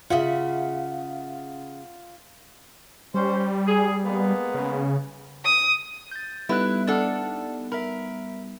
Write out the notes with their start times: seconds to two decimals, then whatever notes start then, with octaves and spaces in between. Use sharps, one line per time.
0.10 C#3 F4 E5 F#5
3.14 G3 C#4 C5
3.68 G#4
4.05 G#3 A#3 B3
4.54 C#3
5.45 D#6
6.11 G6 A6
6.49 G3 B3 D#4 E4 A4 B4 F#6
6.87 D4 A4 D5 F#5 F6
7.72 A#4 E5 B5